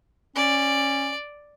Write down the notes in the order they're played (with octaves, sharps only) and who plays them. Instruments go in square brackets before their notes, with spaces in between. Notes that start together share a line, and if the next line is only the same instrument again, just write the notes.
[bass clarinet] C#4 [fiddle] D5